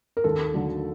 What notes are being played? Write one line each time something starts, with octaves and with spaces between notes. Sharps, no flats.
A#4
D#2 A4
D3 F#3 A3